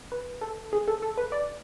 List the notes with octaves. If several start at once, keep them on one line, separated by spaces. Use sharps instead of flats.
B4
A4
G#4
A4
A4
B4
D5